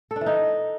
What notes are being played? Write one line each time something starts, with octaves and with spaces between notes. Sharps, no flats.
A4
D4
E3
D#4